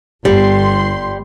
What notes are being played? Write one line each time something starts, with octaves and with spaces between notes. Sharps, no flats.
G1 G3 C6